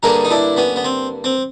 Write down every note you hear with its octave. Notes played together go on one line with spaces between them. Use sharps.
G2 D3 G3 A#3 G#4 A#4
D#4
D4 E4
B3 C#4
B3
C4
C4